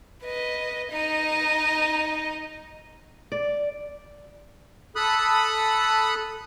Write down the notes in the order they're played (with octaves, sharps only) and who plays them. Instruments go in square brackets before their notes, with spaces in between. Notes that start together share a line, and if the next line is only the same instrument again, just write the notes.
[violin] B4 D#5
D#4 D#5
[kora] D5
[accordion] A4 B5 D#6 F#6